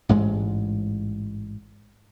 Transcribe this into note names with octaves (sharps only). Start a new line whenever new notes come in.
A1 G#2 G#3